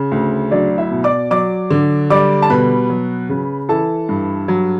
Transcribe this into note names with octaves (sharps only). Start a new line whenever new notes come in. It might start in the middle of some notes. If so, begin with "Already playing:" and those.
Already playing: C#3
D2
F#3 D4 D5
E4 E5
B2
D5 D6
F#3 D5 D6
D3
G3 D5 D6
A5
B2 B4 B5
F#3
C#3
E3 A4 A5
G2
F#3